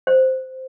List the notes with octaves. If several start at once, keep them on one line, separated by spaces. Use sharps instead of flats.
C5